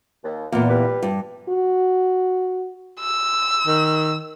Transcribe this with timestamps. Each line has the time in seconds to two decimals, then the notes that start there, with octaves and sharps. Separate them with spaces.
0.24 D#2
0.52 E2 A#2 A#3
0.69 G3 G4 B4
1.02 G2
1.49 F#4
3.00 E6
3.67 D#3